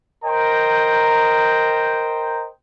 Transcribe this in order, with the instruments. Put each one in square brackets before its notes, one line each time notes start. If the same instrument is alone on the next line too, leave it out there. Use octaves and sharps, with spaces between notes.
[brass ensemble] A#4 C5 D#5 G5 A#5